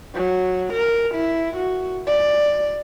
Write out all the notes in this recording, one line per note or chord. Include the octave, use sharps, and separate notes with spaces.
F#3
A#4
E4
F#4
D5